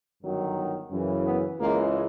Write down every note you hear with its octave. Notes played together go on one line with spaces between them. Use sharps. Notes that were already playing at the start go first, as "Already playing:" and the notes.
G1 F#2 D#3 F#3
F#2 C#3 E3
B3
C#2 C#3 E3 G#3 A#3